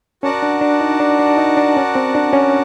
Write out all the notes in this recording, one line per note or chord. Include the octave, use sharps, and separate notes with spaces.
C#4 F#4 A#4 D5 F#5 A5
D4
D4
D#4
D4
D4
D#4
D4
C#4
C4
D4
C#4